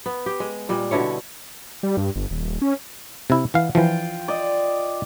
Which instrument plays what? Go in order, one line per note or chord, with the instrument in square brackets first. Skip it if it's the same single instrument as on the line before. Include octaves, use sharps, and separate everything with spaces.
[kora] B3
G4
G#3
A#2 G3 G#3
B2 D3 E4 C#5
[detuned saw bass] G3
G2
G1
D#1
C#4
[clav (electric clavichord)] C3 E4
[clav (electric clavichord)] E3 F5 [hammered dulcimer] F#5
[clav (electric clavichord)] E3 F3 [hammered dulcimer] F4 G5
[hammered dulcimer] D5 D#5